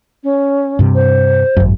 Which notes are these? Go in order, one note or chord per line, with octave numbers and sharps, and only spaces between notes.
C#4
G2 C3
C5
G#1 F#2